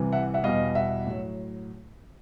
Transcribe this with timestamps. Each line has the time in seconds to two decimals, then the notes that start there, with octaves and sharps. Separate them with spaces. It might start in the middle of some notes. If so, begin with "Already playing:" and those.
Already playing: C2 C3 E3 G3
0.13 E5 F#5
0.34 E5 F#5
0.44 E2 B2 G3 D#5 F5
0.75 E5 F#5
1.06 A2 F#3